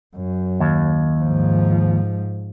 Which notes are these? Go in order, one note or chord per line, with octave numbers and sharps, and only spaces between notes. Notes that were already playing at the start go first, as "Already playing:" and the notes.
F#2
D#2
G#2 F3